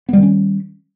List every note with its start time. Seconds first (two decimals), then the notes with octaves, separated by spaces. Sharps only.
0.09 B3
0.13 G3
0.18 D#3
0.22 C#4